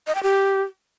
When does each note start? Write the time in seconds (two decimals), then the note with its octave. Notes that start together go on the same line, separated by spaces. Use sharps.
0.07 D#5
0.15 G5
0.23 G4